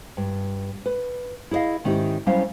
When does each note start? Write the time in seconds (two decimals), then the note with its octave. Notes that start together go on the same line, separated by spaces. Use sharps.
0.17 G2
0.86 B4
1.51 E4 G#4 C5 D#5 F5
1.84 G#2 D#3 C#4 E4 G4
2.26 F#3 G3 C#4 E4 C5 F5